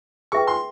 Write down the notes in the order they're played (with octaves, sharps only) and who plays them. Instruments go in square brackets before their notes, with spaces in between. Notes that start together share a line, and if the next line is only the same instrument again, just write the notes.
[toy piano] G#4 B4 E5 G5 [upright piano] C#6
[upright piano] C6